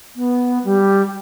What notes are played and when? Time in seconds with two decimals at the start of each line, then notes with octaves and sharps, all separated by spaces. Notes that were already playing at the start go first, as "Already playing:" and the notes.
0.16 B3
0.64 G3